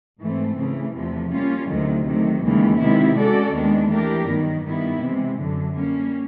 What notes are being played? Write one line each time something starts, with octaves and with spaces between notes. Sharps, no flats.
G#2 E3 A3 C4
C#3 E3 A3
E2 C3 F3 A3
G3 A#3 C#4 F4
D2 C3 D#3 F#3 A3
C3 D#3 F#3 A3
D#2 C#3 E3 G#3
C3 D#3 G#3 B3 E4
G#3 C#4 F#4 A4 D5
D#2 D#3 G#3 B3 D4
E3 A3 D4 G4 A#4
G2 D#3 F#3 B3
G2 D#3 G3 B3 E4
C3 E3 G#3
F#2 D3 F#3
G3 A#3 C#4